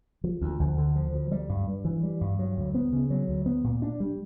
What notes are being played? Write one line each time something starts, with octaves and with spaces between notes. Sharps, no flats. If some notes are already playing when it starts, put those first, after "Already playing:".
F3
D2
D2
D3
F3
D2
G3
G2
G2
E3
G3
G2
F#3
D2
B3
C#3
F#3
D2
B3
A#2
D4
G3